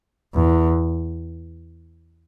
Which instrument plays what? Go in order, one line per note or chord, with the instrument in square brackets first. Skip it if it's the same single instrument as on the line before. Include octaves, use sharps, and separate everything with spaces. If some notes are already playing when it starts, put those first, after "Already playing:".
[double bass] E2